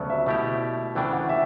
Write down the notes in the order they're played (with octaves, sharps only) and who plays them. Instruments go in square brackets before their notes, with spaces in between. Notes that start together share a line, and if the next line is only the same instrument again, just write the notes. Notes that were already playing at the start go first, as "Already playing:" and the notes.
Already playing: [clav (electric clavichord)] D2 C#3 F#3 B3 [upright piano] D5 A5
[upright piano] E5
[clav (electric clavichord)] B2 A3 E4 G4
[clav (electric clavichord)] D2 C#3 E3 A3 D4 [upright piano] G5
[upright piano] F#5
E5